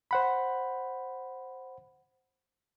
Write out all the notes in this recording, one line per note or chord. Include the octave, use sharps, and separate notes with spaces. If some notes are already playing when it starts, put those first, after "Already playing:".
C5 F#5 B5